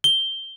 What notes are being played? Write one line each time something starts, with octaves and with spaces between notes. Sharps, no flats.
G7